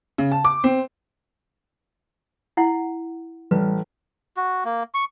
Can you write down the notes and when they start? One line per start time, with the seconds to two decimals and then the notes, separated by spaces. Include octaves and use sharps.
0.18 C#3
0.32 A5
0.45 D6
0.64 C4
2.57 E4 F#5
3.51 A1 G3 B4
4.37 F#4
4.65 A#3
4.94 C#6